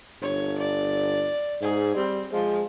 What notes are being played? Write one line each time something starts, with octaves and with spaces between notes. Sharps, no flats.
G1 C#5
D5
G#2 G#4
G3 C4
F3 G#3